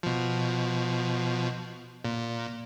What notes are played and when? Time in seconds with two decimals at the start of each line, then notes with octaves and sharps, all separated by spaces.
0.03 B2 F3
2.05 A#2